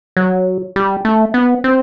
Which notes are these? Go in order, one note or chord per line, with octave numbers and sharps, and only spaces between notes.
F#3
G3
A3
B3
C4